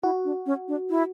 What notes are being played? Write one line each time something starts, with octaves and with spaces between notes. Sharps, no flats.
E4 F#4
D4
C#4
D4
E4